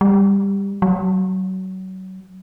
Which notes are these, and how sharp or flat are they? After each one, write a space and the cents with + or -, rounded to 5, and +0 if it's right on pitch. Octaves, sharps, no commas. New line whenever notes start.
G3 +15
F#3 +25